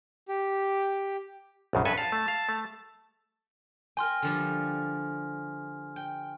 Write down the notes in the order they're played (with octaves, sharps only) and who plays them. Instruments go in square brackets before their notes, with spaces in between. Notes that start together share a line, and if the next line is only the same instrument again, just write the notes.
[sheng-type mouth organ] G4
[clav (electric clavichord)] A#1 F#2 C#3
[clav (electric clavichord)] G2 A4 G#5 [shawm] B4
[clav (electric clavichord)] F5 [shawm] A5
[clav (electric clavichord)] A3
F5
A3
[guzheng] A#4 G5 [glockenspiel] G#5 C6 F6
[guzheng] D3 F3 G3
G5